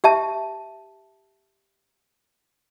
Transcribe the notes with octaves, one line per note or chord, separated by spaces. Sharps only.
G4 E5 A5